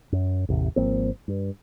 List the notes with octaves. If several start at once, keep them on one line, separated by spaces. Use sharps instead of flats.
F#2
A1 E2 C3
G#1 F3 A#3 C4
G2